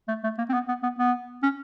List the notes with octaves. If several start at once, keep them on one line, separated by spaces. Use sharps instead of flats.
A3
A3
A#3
C4
B3
B3
B3
B3
C#4